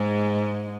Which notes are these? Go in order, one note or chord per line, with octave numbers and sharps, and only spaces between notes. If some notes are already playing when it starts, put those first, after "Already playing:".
Already playing: G#2 G#3